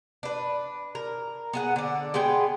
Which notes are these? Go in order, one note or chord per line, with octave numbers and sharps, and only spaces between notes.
D4 B4
A#4
B3 G#4 F#5
D3 D4
G#3 B3 G#4 G5